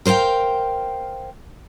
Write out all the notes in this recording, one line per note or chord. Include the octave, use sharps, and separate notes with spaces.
A#4 C5 D5 F5 G5